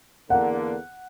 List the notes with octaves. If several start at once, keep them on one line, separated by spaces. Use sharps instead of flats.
E2 D3 A#3 F#5